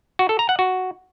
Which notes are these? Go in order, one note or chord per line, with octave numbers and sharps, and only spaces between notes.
F#4
A4
A#5
F#5
F#4